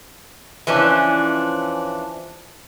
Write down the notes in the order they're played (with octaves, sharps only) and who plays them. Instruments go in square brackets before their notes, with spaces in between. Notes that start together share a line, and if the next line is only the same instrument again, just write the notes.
[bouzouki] E3 F3 C#4 D4